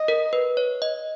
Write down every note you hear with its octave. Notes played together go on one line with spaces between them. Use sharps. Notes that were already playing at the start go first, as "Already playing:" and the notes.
Already playing: D#5
A#4
B4
C#5
D#5